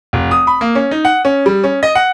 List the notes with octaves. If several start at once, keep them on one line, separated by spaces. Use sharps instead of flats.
F1
D#6
B5
A#3
C#4
D#4
F#5
C#4
G3
C#4
D#5
F#5